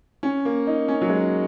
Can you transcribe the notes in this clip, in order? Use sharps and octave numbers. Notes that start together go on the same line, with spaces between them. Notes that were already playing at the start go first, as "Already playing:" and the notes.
C#4
A#3
D#4
C#4
F#3
G#3